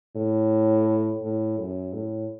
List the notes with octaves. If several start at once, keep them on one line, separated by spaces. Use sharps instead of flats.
A2
A2
F#2
A2